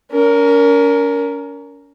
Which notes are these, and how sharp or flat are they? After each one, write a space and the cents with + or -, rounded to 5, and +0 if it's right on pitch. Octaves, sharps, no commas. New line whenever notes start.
C#4 +35 A#4 +0